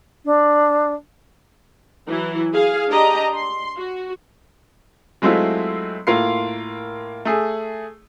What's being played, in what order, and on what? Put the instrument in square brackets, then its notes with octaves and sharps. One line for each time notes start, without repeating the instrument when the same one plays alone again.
[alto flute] D4
[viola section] E3 F#3 E4
G#4 F5
D4 G4 D#5 A#5
C6
F#4
[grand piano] F#3 G#3 A3 C4 E4 F4
A2 A#3 F4 A#4 C6 C7
A3 G#4